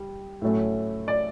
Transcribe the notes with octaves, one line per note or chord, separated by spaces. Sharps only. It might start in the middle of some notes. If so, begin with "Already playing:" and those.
Already playing: G3
A2 F#3 A3 C#4
D5